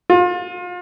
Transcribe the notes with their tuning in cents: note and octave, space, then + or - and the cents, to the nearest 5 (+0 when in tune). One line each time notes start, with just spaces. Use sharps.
F4 +35